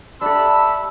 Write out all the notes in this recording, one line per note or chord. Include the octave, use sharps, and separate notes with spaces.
D4 G4 A4 E5 A5 B5 E6